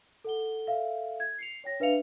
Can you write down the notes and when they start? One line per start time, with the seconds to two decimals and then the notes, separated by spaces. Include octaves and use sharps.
0.25 A4 F#5 G7
0.67 A4 E5 F5
1.20 G#6
1.38 C7 C#7 F7
1.64 C#5 G5 A#6
1.80 D4 B4 E5 F5 C#7 F7